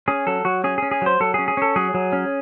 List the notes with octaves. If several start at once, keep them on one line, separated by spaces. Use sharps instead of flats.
C#4 G#4
F#3 A4
F#3 F#4
C#4 G#4
C#4 G#4
G#4
F#3 C5
F#3 A4
C#4 G#4
G#4
C#4 A4
F#3 G#4
F#3
C#4